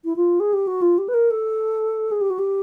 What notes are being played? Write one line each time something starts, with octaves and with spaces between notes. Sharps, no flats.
E4
F4
G#4
G4
F#4
F4
G4
B4
A#4
A4
G#4
G4
F#4
G4